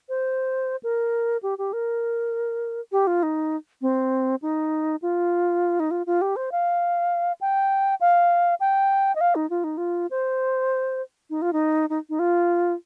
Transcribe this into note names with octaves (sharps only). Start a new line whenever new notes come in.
C5
A#4
G4
G4
A#4
G4
F4
D#4
C4
D#4
F4
D#4
F4
F4
G4
C5
F5
G5
F5
G5
D#5
F5
D#4
F4
D#4
F4
C5
D#4
F4
D#4
D#4
D#4
F4